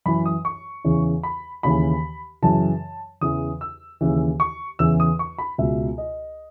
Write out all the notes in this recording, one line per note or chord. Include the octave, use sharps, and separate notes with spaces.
F#2 E3 B5
D#6
C#6
E2 C#3 E3
B5
D#2 C#3 E3 B5
F#2 C#3 E3 A5
E2 C#3 E3 D#6
E6
D#2 C#3 E3
C#6
E2 C#3 E3 E6
D#6
C#6
B5
C#2 B2 E5
D#5